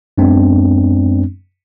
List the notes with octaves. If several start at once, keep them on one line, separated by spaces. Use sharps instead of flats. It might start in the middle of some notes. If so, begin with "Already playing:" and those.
F#2 G#3 B3 C4 D4